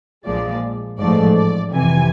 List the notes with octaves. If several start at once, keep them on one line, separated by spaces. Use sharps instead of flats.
A#1 A#2 F3 G#3 D5
A1 G#2 F3 A3 D5
D5
F2 C3 E3 G#5